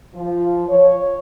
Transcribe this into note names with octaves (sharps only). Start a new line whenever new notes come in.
F3
C#5